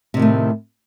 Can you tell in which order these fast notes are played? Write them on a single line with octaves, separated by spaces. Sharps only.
C3 D#3 A2 A3